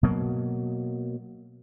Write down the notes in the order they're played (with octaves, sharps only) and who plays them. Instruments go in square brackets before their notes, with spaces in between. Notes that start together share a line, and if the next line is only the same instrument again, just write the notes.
[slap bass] B2 F#3 A#3